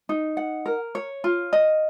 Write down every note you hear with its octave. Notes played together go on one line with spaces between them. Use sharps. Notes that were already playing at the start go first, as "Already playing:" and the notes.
D#4
F#5
A#4
C#5
F4
D#5